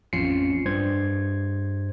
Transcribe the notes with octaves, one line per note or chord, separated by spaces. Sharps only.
A1 F2 C#4 F4 C7 C#7
G2 C5 G#6